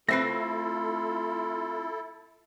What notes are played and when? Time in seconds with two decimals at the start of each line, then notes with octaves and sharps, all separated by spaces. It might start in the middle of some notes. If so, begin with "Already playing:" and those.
0.09 A3 C4 E4 F4 A4 B4 A#6 C7